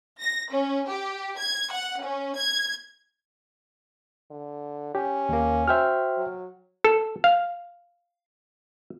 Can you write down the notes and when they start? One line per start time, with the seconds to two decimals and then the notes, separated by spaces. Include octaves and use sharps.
0.21 A#6
0.51 C#4
0.89 G4
1.39 G#6
1.72 F#5
2.02 C#4
2.36 G#6
4.31 D3
4.95 C#4 G4
5.29 D#2 A#3
5.68 F#4 C5 E5 G5 F6
6.17 F#3
6.84 A4
7.24 F5